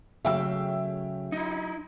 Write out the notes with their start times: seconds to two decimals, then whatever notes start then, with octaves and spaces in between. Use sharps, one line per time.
0.25 C#3 F#3 G#3 A3 E5 F5 G5 E6
1.32 D#4 E4